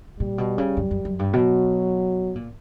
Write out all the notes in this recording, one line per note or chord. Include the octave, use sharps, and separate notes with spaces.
A#2 G3
B2
C#3
F#2
F#2
F#2
G2
B2 F#3
A#2